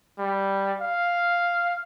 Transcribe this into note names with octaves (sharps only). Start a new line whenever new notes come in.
G3
F5